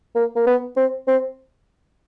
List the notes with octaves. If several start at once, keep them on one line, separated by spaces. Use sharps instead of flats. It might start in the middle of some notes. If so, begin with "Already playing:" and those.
A#3
A#3
B3
C4
C4